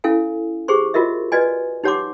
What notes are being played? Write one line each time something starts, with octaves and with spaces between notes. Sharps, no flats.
C#4 E4 A4 F5 G#5
G4 G#4 C5 C#6
F4 F#4 A#4 D#5 E5
F#4 B4 D5 D#5 G#5
D#4 G4 C#5 F#5 C6 D6